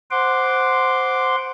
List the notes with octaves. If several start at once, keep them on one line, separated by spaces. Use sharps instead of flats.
C5 F#5 C6 D6